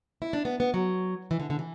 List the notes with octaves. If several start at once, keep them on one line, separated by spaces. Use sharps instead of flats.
E4
D4
B3
B3
F#3
E3
D3
D3
E3